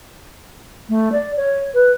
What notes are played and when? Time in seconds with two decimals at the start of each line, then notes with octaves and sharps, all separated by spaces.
0.89 A3
1.12 D5
1.37 C#5
1.74 B4